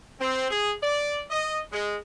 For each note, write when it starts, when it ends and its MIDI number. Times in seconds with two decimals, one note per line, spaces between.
0.21 0.50 60
0.50 0.72 68
0.83 1.22 74
1.30 1.60 75
1.72 1.96 56